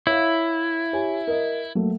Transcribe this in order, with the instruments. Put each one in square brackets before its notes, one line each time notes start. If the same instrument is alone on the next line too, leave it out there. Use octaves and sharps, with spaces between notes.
[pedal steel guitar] E4 [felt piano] C#5 F5
[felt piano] G4 C#5 G#5
A#4 D#5
F#3 A3 A#3